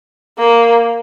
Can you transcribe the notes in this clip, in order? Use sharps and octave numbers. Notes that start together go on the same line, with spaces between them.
A#3